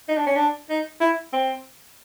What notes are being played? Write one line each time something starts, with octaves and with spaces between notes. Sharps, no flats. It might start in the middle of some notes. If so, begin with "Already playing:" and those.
D#4
D4
C#4
D4
D#4
E4
C4